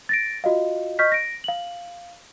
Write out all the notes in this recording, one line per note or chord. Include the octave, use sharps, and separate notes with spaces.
A6 A#6 D7
F4 F#4 D#5 F5
D#5 C#6 F6 G6 B6
A#6 D7
F5 F#7